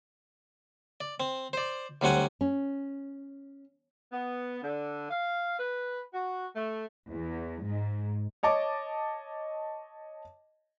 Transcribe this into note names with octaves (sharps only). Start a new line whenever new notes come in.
D5
C4
C5 D5
D2 F#3 G3 C4 F#5 G#5
C#4
B3
D3
F5
B4
F#4
A3
E2
G#2
C#5 D#5 A5 D6